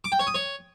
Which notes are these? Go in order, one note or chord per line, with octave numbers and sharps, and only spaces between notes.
D6
G5
C#5
D#6
C#5